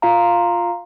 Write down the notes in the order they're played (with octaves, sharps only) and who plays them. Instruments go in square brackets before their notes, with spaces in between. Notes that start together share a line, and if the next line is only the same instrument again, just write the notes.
[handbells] F4 F5 A#5